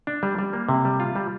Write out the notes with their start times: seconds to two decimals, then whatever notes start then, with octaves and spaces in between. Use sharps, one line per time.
0.07 D4
0.23 G3
0.38 G3
0.53 A#3
0.69 C3
0.85 G3
1.00 F4
1.16 G3